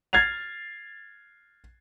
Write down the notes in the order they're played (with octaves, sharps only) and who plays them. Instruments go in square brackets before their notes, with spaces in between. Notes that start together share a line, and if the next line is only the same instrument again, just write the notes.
[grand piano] F6 G#6 A6 C7 F7